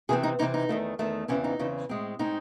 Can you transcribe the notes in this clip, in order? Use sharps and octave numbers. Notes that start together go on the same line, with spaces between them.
C3 E3 C4 G#4
D#4
C3 E3 C4 D#4
D#4
E2 D#3 A3
E2 D#3 A3
E2 C#3 E3 C4 C#4
D#4
E2 C#3 E3 C4
A2 G#3 C4
A2 G#3 C4 D#4